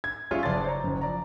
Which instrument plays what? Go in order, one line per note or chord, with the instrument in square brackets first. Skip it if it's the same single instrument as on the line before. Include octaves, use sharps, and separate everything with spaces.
[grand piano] G#6
G3 C#4 F4 G#4 C#5 E5
F#1 D5 A5 C6 A6
C5 C#5 A#5
F#1 F#2
F3 D5 A#5